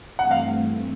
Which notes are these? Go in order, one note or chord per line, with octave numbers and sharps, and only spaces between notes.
G2 E3 A3 C4 F#5
F5